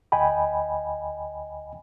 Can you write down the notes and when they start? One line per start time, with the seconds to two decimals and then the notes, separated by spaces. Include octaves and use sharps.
0.12 D2 D#5 G5 G#5 B5